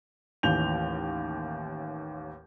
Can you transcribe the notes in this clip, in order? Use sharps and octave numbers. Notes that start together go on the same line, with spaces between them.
A1 D#2 G6 F7